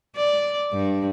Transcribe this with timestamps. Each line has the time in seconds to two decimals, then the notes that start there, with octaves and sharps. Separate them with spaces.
0.16 D5
0.73 G2